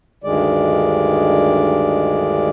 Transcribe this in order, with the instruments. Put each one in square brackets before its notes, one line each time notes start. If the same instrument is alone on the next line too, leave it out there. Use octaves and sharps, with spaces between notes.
[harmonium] D2 G2 D#3 G#3 D5